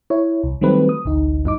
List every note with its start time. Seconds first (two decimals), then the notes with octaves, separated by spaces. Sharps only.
0.10 E4 C#5
0.43 C2
0.61 D#3 F#3 G3 A3 C4 B4
0.89 D#6
1.05 A1 D2 D#4
1.45 G2 D#4 D6